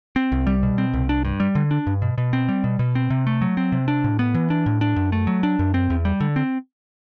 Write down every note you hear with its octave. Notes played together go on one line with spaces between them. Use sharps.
C4
C2
G3
B2
C4
C2
D4
G2
G3
D3
D4
G2
B2
B2
C4
G3
B2
B2
C4
C3
A3
F#3
C4
C3
D4
A2
B3
E3
D4
A2
D4
F#2
A3
F#3
D4
F#2
C4
E2
G3
D3
C4